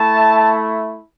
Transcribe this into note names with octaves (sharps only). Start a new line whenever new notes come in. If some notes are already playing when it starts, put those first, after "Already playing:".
Already playing: A3 E4 A5